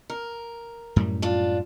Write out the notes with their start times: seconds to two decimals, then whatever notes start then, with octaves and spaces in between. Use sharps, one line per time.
0.10 A#4
0.96 F#2 A2 G3
1.22 D4 F4